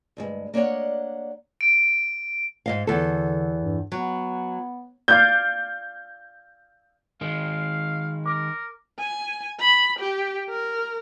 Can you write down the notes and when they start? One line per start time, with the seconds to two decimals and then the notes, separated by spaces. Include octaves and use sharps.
0.17 D2 G2 G#3
0.54 A#3 D4 C#5 D#5 F#5
1.61 D7
2.66 G#2 D#5 F5
2.87 E2 D3 A4
3.60 G2
3.92 F#3 B3
5.08 D5 F5 G6
7.21 D#3 G#3 F5
8.26 A#4 D6
8.99 G#5
9.60 B5
9.99 G4
10.49 A#4